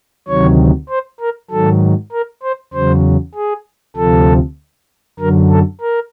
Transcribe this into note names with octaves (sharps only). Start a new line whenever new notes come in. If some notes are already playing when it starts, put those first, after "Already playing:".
D2 C3 D#3 F#3 C#5
C5
A#4
G#2 D#3 F#3 A4
A#4
C5
E2 C#3 F#3 C5
G#4
D2 C3 F3 A4
F#2 D3 F#3 A#4
A4
A#4